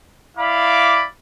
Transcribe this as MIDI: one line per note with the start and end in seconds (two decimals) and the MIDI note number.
0.37 1.05 64
0.37 1.05 74
0.37 1.05 77
0.37 1.05 83
0.37 1.05 86